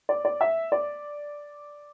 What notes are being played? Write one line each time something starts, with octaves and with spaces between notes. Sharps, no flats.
D5
D5
E5
D5